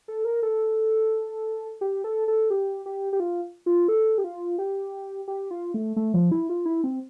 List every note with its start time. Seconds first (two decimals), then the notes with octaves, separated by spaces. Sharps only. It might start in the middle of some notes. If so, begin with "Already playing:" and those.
0.08 A4
0.25 A#4
0.43 A4
1.81 G4
2.04 A4
2.28 A4
2.50 G4
2.86 G4
3.13 G4
3.20 F4
3.66 F4
3.88 A4
4.18 G4
4.24 F4
4.58 G4
5.28 G4
5.51 F4
5.74 A3
5.96 A3
6.14 F3
6.32 E4
6.49 F4
6.65 E4
6.84 C4